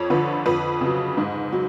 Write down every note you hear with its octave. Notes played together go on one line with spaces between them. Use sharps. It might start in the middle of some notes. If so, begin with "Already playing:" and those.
Already playing: F2 C#5
D3 F3 B4
F2 B4
C#3 F#3
G#2
F#3